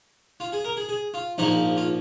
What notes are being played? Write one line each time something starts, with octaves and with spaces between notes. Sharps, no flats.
F4
G#4
A#4
G#4
G#4
F4
A#1 G#2 F3 A#3 D#4
F4